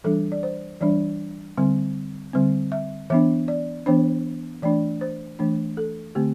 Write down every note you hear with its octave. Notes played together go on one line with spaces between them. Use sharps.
E3 G3 D4 A4
D5
C5
E3 G3 D4 D5
D3 G3 C4
D3 G3 C4
E5
E3 B3 D4 E5
D5
E3 B3 D4 C5
E3 A3 D4 D5
C5
E3 A3 D4
A4
D3 A3 C4 G4